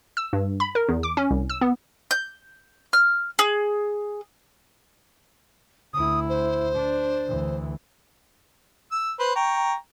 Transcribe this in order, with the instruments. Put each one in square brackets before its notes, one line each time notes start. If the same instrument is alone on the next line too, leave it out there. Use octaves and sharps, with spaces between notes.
[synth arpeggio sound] E6
G2
B5
A#4
E2
D6
C#4
C2
E6
B3
[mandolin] G6
F6
G#4
[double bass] D2 E4 [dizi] D#6
[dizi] C5
[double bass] D4
D2 E3
[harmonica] E6
B4 C5
G5 A#5 C#6